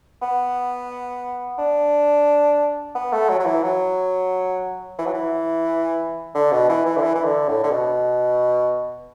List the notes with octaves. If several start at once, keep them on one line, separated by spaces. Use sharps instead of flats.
B3
D4
B3
A3
F#3
F#3
E3
F#3
E3
F#3
E3
D3
B2
E3
E3
D3
E3
E3
D3
A2
D3
B2